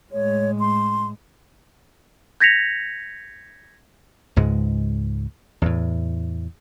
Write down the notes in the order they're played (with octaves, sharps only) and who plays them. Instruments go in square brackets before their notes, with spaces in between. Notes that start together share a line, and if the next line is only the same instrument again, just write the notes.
[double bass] A2 G#3 [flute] C#5
[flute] C6
[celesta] G6 G#6 A#6 B6 C#7 F7
[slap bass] C#2 G#2 G#3
E2 A2